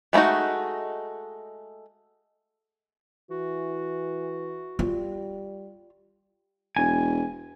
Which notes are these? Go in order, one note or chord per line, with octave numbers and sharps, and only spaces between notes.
G#3 A3 B3 D#4 F#4
E3 F#4
G3 F4
E1 G#5